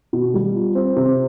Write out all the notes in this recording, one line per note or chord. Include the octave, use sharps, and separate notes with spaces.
B2
G3
F4
C4
C3